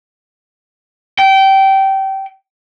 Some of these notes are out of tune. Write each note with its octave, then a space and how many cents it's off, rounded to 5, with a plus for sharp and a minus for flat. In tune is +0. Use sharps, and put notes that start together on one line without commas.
G5 -20